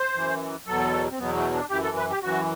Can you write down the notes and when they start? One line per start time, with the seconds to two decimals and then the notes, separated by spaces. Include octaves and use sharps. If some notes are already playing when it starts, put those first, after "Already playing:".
Already playing: C5
0.14 F#2 E3
0.67 E2 B2 F#3 A4
1.11 C4
1.19 E2 B2 F#3 B3
1.36 A3
1.53 D4
1.70 F#2 E3 G4
1.83 A4
1.96 B4
2.10 G4
2.22 F#2 E3 F#4